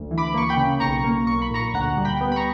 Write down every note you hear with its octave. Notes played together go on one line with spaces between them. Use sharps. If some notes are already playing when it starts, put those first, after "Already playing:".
Already playing: D2
E3
B5 D6
A#3 C#6
G5 B5
C#3
B1 A#5 C#6
A#3
B1 C#6
B5
A#2 A#5 C#6
D2 F#5 A#5
G3
G5 B5
B3
B5
A#5 C#6